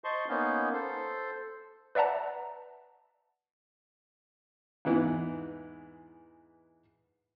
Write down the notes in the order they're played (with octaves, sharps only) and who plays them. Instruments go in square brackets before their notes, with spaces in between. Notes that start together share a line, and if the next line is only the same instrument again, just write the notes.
[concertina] C5 D#5 A5 C6 C#6
A#3 B3 C#4 D#4
A4 C5
[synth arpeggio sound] B4 D5 E5 F#5 A5 A#5
[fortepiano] E2 G#2 E3 B3